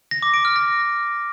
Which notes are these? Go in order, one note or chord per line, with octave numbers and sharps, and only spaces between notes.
A#6
D6
D7
F6
A#6